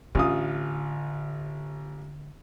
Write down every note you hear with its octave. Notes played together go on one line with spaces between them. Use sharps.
A1 D3 F4 D#6